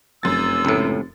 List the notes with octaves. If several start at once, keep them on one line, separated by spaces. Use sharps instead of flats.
F1 F#2 E6 A6
C#2 A2